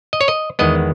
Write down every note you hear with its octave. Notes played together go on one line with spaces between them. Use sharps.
D#5
C#5
D#5
E2 D#3 G#3 B3 D#5